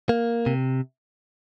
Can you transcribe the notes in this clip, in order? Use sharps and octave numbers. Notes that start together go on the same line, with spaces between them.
A#3
C3